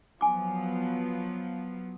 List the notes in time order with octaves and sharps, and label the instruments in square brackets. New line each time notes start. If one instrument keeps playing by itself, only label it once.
[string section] F3 F#3 B3 [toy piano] G#5 D6